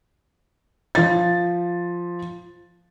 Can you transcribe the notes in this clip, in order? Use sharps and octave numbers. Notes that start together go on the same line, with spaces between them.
F3 A6